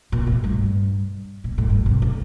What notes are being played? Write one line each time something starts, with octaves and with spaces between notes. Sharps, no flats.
A#2
A2
G2
A#2
A2
G2
C3
D3